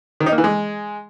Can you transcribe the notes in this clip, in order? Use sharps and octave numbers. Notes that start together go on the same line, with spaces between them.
D#3
D#4
A#3
E3
G#3